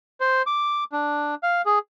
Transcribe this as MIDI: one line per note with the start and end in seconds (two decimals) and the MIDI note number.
0.20 0.42 72
0.46 0.84 86
0.92 1.35 62
1.43 1.62 77
1.66 1.79 68